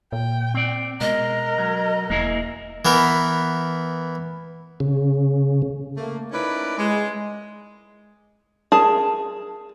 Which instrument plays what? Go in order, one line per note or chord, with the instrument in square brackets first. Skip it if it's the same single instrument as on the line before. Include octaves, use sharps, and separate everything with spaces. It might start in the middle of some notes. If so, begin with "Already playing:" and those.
[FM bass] A#2 [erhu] G5
[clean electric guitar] C4 D5
[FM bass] B2 [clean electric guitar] G#3 [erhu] A#4 [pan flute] D#5
[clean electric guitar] F#3
[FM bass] E1 [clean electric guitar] A#3 E4 G#4
[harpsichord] E3 B3 A#4
[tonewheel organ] C#3
[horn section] A3 A#3
C#4 D#4 E4 A#4 B4 D5
G#3
[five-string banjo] G#4 A#4 A5